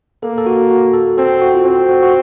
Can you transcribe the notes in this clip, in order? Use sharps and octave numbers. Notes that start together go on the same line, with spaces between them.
A#3 A4
A4
F#4
F#4
A4
C4 A4
F#4
F4
C4 F#4
F#4
F#4